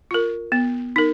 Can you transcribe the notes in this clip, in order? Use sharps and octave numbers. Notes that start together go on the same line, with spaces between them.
F4 A#4
B3
D#4 A#4